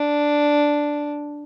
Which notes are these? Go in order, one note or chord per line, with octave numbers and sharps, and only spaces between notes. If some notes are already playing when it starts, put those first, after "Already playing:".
Already playing: D4